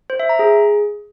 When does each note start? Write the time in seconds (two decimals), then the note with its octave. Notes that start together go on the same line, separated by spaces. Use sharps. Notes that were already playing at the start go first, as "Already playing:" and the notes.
0.10 C5
0.20 E5
0.29 A#5
0.39 G#4